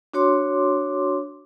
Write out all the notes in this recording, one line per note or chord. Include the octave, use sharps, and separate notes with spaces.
D4 F#4 C#5 C6 D6